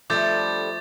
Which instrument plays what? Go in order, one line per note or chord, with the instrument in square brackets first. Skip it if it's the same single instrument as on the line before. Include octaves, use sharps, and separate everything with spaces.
[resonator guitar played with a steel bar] F3 A3 [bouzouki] G3 D4 A4 [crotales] D6 G6 A6